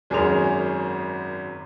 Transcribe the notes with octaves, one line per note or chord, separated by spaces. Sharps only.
G#1 F#2 G#4 A#4 C6 F7